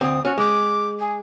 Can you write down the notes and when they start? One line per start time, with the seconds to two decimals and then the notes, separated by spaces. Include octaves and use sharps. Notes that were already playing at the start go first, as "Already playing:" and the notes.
0.01 D2 C4 D#6
0.25 C#4 F#4
0.38 G#3 D6
0.99 G#4